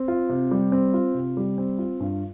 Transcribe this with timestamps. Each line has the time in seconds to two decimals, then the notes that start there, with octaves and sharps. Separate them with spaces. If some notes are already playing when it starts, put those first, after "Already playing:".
Already playing: C4
0.08 F4
0.29 C3
0.51 G3
0.72 C4
0.94 F4
1.15 C3
1.37 G3
1.58 C4
1.78 F4
2.00 G2